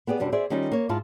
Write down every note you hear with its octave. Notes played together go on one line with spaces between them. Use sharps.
B3 G4 G#4 D5
F#2 C3 G3 D4
G#4 C5 D5 E5
D#3 G3 C#4 D#4 F4
A#3 C#5
G#2 E4 F4 A5